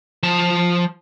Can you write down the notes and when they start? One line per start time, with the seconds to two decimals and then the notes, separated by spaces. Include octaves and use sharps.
0.23 F3 A5